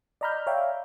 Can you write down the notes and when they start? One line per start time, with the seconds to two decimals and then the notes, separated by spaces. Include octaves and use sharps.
0.21 D5 D#5 A#5 B5 F6 G6
0.47 C#5 D5 E5 F5 G5